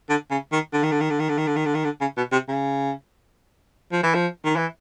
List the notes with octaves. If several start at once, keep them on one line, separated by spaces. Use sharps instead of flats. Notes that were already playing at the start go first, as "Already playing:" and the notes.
D3
C#3
D#3
D3
D#3
D3
D#3
D3
D#3
D3
D#3
D3
D#3
D3
D#3
D3
C#3
B2
C3
C#3
F3
E3
F3
D#3
E3